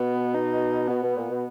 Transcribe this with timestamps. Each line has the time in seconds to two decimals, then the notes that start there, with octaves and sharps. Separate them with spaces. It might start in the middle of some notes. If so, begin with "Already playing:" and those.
Already playing: B2 B3
0.34 D#4
0.88 B2 B3
1.02 B2
1.16 A#2
1.29 B2